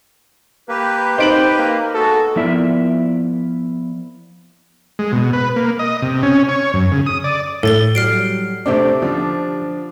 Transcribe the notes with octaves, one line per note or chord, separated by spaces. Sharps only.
A#3 G4 B4
D#4 C5 D7 F#7
A#3
G#3 B3 F#4 A4
F3 B3 E4 A#4 D5 E5
G#3
B2
B4
A#3
D#5
C3
C#4
C#5
F#2
C#3
D#6
D5
A2 A4 A6 G7
F#3 G3 F6 C7 D7
C3 A3 D4 G4 C5 D5
D3 F3 D4